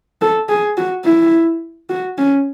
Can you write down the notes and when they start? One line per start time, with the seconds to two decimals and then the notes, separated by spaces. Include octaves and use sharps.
0.21 A4
0.49 G#4
0.77 F#4
1.05 E4
1.90 F#4
2.18 C#4